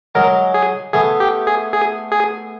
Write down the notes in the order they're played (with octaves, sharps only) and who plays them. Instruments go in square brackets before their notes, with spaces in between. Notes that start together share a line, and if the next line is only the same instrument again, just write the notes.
[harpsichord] F#3 G#3 [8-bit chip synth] A#4
[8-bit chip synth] G#4
[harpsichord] A3 B3 [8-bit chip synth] G#4
[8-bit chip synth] G4
G#4
G#4
G#4